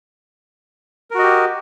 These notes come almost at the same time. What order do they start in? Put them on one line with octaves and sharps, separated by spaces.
A#4 F#4 D#5 G4